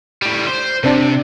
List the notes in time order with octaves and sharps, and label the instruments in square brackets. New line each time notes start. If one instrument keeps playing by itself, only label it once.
[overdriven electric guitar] A2 G3
C5
[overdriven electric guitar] C3 [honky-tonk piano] C4 D4